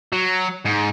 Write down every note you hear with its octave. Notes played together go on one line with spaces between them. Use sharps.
F#3
G#2